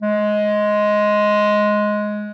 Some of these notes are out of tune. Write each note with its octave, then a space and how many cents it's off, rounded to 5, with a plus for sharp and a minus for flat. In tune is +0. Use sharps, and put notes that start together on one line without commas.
G#3 +10